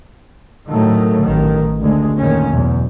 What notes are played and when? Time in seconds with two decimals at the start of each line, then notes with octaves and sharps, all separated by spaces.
0.68 A2 D#3 F#3 A3
1.22 A1 D#3
1.81 D2 G#3
2.18 F2 A#2 D#3 C#4
2.49 B1 E2 G#2